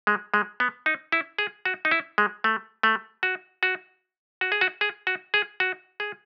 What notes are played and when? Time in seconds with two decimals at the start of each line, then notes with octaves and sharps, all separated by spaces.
0.07 G#3
0.34 G#3
0.60 B3
0.86 D#4
1.12 E4
1.38 G#4
1.65 F#4
1.85 D#4
1.91 E4
2.18 G#3
2.44 A3
2.83 A3
3.23 F#4
3.63 F#4
4.41 F#4
4.52 G#4
4.61 F#4
4.81 G#4
5.07 F#4
5.34 G#4
5.60 F#4
6.00 G#4